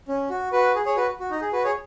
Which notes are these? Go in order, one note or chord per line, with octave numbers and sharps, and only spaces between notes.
C#4
F#4
F#4 B4
G#4
G#4 C#5
F#4 B4
F#4
D#4
G#4
F#4 B4
G#4 C#5